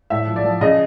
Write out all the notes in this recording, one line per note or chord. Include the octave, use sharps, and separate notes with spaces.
A2 E5
F3
D5
F3
C#3 D#5